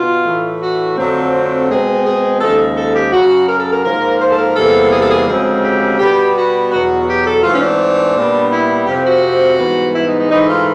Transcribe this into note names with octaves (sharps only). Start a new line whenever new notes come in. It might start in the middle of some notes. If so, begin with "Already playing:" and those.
Already playing: B2 F4
A2 E3 A3
F#4
F2 D3 F#3 A3 C4
B2 G#3 C4 G#4
G#4
D#2 C#3 F3 G#3 A4
A4
G4
F#2 C#3 F#3 F#4
A#4
A4
A#4
G#2 F3 A#3 A#4
C5
A4
A#4
E2 C3 E3 G3 A#3 A4
G#4
A4
G#4
D2 C#3 F3 G#3 C4 G#4
G4
B2 G3 B3 G4
F#4
E2 B2 F#3 F#4
F#4
G4
A4
G#2 E3 A3 C4 F4
C#4
D4
A#2 G3 B3
E4
F2 C3 F3 G4
F#4
G#2 E3 G3 B3
E4
D#4
D#4
G#2 E3 A3 D#4
F4